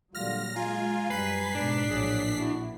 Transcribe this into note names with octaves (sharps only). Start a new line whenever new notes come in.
A#2 D3 F#3 G3 F4 F6 A#6
G#3 F4 G#5 A#5
F#2 G3 B4 B6 C7
G#2 B2 D4
A#1 A2 F#3 G#4
E4 F#4